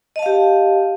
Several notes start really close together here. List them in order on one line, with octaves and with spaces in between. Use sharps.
D#5 A5 F5 G4